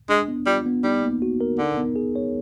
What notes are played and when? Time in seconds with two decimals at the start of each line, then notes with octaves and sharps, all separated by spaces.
0.09 G#3 D4
0.28 B3
0.47 G3 F4
0.66 B3
0.84 G3 D#4
1.03 A#3
1.22 F#4
1.41 A#4
1.59 D3 D#4
1.77 B3
1.96 G#4
2.16 C#5